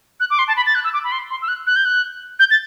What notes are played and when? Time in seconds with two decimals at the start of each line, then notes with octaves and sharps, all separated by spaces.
0.20 F#6
0.30 D6
0.39 C6
0.48 A5
0.57 B5
0.66 A6
0.75 F#6
0.84 E6
0.93 D6
1.04 B5
1.12 C6
1.30 C6
1.42 E6
1.48 F#6
1.67 F#6
1.76 G6
1.85 F#6
2.39 G6
2.51 A6